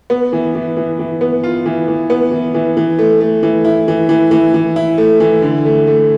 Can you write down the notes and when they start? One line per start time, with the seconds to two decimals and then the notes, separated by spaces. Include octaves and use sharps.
0.10 B3
0.33 E3
0.55 E3
0.77 E3
0.99 E3
1.21 B3
1.43 F4
1.66 E3
1.88 E3
2.10 B3
2.31 E3
2.54 E3
2.77 E3
2.98 A3
3.20 A3
3.43 E3
3.65 E4
3.88 E3
4.09 E3
4.31 E3
4.54 E3
4.76 E4
4.98 A3
5.20 E3
5.42 D3
5.65 A3
5.87 A3